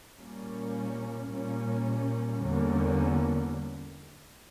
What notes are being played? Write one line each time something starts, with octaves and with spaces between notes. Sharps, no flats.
A#2 G3 A#3 C#4
A#2 G3 A#3 C#4
E2 D3 G3 A#3 C#4